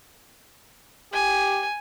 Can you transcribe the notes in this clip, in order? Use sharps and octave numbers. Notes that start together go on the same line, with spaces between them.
G4 G#5